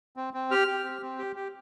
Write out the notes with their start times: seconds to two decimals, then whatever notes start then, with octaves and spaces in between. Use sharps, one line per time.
0.17 C4
0.34 C4
0.51 G4 F6
0.68 G4
0.84 C4
1.02 C4
1.18 G4
1.36 G4